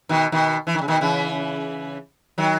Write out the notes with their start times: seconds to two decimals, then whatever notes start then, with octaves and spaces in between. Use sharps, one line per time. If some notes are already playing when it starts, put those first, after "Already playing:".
0.09 B2 D#3
0.32 B2 D#3
0.67 E3
0.75 D#3
0.81 C#3
0.88 B2 D#3
1.01 C#3 E3
2.38 D#3 F#3